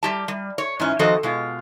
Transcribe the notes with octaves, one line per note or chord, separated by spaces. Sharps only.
G3 G4 A5
G3
C#5
G#2 E3 C#4
D#3 F3 C4 F#4 A4 D#5
B2 G#3 F4